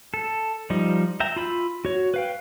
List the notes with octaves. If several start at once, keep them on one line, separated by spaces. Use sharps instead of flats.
A4
F3 G3 D#4
E5 G5 A#5
F4 B5 E6
F#4 C#5
B4 F5 G5